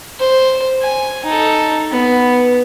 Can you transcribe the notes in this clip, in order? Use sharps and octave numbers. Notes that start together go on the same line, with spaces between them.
C5
G#5
D#4 A4
B3